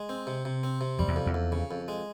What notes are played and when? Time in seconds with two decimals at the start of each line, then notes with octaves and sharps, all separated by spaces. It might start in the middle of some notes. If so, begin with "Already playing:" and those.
Already playing: G#3
0.09 C4
0.27 C3
0.45 C3
0.63 C4
0.81 C3
0.99 F2 G3
1.08 E2
1.16 F2
1.26 E2
1.34 F2
1.52 C#3
1.71 F2
1.88 G#3